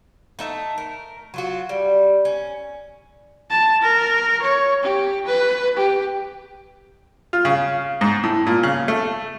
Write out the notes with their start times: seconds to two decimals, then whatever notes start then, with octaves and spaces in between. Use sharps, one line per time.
0.39 A3 D#4 E5
0.78 A#4
1.34 F#3 F4 F#4
1.69 G3
2.25 C#4
3.50 A5
3.82 A#4
4.42 C#5
4.83 G4
5.26 B4
5.77 G4
7.33 F4
7.45 C#3
8.01 G#2
8.23 A2
8.46 A#2
8.63 C#3
8.88 A3